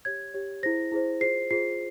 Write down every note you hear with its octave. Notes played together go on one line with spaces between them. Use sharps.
G4 C#5 G#6
G4 C#5
E4 G#4 C5 A#6
E4 G#4 C5
F4 G#4 C5 C7
F4 G#4 C5 C7